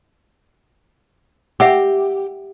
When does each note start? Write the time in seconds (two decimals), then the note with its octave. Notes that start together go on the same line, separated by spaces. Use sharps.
1.60 G4 E5 F#5 E6